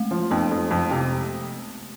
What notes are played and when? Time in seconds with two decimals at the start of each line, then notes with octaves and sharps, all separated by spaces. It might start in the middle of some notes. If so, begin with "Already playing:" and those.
Already playing: G#3 A3
0.11 F3
0.31 F2 B3
0.51 F2
0.71 F2
0.91 C3